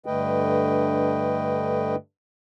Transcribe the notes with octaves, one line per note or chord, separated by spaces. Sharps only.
G2 D3 A3 B4 D#5 G5